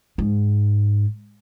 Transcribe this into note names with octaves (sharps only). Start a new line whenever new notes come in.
G#2